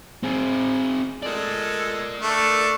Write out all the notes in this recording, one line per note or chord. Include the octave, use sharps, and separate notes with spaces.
C4 G#4
G#3 A4 A#4 D5
A3 D4